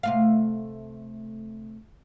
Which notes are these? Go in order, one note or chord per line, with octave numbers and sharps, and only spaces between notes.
C3 A3 F5